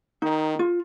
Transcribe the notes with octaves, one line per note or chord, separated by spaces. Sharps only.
D#3 D#4
F4